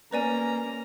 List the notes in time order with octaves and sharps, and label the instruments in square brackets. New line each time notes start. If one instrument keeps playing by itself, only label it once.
[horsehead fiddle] A#3 C#4 [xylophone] B4 D5 G#5 [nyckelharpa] A#5